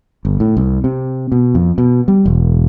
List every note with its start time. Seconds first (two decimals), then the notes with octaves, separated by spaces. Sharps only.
0.25 G1
0.40 A2
0.57 C2
0.84 C3
1.32 B2
1.55 F2
1.78 B2
2.08 G3
2.26 E1